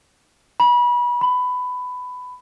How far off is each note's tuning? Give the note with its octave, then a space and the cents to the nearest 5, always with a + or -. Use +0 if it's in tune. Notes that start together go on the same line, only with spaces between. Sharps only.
B5 -30
B5 +15